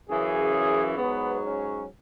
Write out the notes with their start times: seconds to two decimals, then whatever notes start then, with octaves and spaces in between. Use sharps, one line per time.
0.09 F#2 C#3 E3 G#4
0.97 G#2 F#3 B3
1.43 C#4